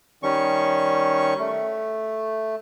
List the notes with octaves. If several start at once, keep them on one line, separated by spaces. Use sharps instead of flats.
D#3 G3 C#4 C#6
A3